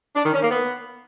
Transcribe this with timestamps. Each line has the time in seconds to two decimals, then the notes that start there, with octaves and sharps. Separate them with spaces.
0.16 D4
0.25 D#3
0.33 C#4
0.42 A#3
0.51 B3